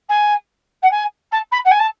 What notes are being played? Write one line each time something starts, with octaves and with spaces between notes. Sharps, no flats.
G#5
F#5
G#5
A5
B5
F#5
G#5
A5